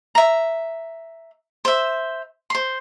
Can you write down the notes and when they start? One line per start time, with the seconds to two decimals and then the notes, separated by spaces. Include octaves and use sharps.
0.15 E5 A#5
1.65 C5 E5
2.50 C5 C6